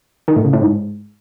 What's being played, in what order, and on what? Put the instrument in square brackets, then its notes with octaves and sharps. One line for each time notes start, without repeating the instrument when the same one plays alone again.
[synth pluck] D#3
A2
C#3
A2
G#2